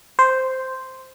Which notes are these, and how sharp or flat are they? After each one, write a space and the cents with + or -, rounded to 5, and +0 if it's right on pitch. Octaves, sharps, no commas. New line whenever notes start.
C5 -5